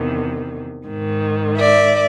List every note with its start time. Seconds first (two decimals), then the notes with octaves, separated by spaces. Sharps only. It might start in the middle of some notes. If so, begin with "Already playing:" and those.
Already playing: E2 C3 D#3
0.88 G#2 D#3
1.57 D5 E5